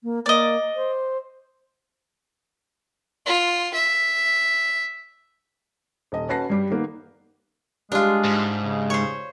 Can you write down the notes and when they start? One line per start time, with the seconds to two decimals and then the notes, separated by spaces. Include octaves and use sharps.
0.03 A#3
0.26 A#3 D5 D#5
0.76 C5
3.26 F4
3.74 E5
6.12 D#1 D#5
6.29 C#4 F#4 B4 A5 A#6 C7
6.50 G2 G3 G4
6.70 D#3 A#3 B3
7.92 G3 G#3 D4 F4
8.24 G#2
8.61 C#3
8.90 C5 C#5